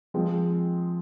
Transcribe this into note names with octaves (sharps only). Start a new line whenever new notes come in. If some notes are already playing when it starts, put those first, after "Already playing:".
F3 G#3 C4 F4